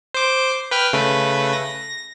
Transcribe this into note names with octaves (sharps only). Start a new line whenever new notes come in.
C5 D6
B4 G5 F6
C#3 A3 B4
A#6